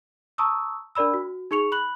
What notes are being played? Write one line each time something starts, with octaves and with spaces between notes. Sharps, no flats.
A5 A#5 C#6 D#6 E6
D4 A#4 D5 B5 E6
F#4
D#4 G#4 C#6 C#7 F7
B5 F#6 F#7